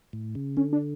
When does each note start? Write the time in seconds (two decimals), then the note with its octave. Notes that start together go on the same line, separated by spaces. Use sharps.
0.13 A2
0.35 C#3
0.57 D3 C#4
0.73 D4